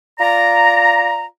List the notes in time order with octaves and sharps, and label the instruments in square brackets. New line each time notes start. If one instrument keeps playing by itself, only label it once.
[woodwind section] F4 D5 A#5